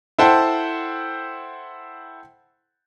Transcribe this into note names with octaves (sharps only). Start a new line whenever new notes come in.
E4 A4 C5 F#5 G5 A5